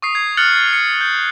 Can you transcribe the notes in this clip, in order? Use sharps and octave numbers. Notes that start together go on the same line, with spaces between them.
C#6 D#6 C7
G#6 C7
F6 F#6 A6 C#7 F#7
A6
C#7
G6